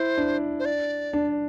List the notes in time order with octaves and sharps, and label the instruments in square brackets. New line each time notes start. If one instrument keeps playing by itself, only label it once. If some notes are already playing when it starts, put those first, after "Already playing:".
Already playing: [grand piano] E4 [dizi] C5
[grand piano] D4
[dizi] C5
D5
[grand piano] D4